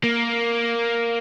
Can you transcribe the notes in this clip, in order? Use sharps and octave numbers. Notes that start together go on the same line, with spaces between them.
A#3